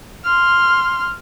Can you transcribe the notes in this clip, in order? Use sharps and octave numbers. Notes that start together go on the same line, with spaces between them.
C6 F6